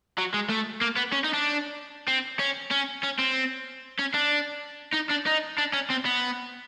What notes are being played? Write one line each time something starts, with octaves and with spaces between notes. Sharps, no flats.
F#3
G#3
A3
A#3
B3
C#4
D#4
D4
C4
C#4
C#4
C#4
C4
C#4
D4
D#4
D4
D#4
D4
C#4
C4
B3